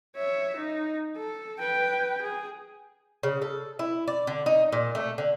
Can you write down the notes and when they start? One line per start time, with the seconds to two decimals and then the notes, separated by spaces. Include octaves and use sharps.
0.16 C#5 E5
0.56 D#4
1.17 A4
1.59 B4 G5
2.22 G#4
3.23 C#3
3.42 A4
3.79 E4
4.08 D5
4.27 D3
4.46 D#4
4.72 A#2
4.95 A3
5.18 D3